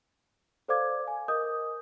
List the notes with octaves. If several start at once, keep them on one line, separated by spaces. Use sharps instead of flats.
A4 C5 D5 F5 D6 G#6
G#5
A#4 D#5 D#6 G6